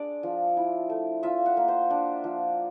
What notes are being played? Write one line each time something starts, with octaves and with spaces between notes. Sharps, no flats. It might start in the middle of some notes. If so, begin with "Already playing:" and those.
Already playing: G#3 D4 D5
F3
E4
A3
F4 E5
F#5
A#3
C5
D4
F3